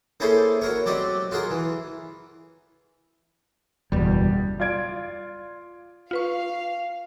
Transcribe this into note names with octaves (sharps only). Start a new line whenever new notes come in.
A#3 C#4 E4 G#4 A4 C5
F#4 A#4 C#5
F#3 C4 G4 D5 D#5
F4 F#4 G#4 A#4
E3
F#1 E2 B2 G3
F4 D5 G#6 D7
F4 B4 F5 C#6